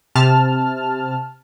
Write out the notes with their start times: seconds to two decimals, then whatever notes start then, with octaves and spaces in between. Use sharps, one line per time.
0.15 C3 A5 F6